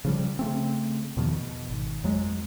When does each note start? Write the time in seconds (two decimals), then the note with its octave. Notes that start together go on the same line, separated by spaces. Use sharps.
0.05 C#3 F3 G3
0.39 C#3 A3 C4
1.17 E2 B2 D#3 F3
1.36 B2
1.69 G#1
2.04 F2 F#3 G#3